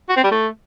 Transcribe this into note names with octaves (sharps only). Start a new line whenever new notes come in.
F#4
C4
G3
A3